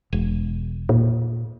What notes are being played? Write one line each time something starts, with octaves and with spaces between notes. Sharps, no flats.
E1
A#2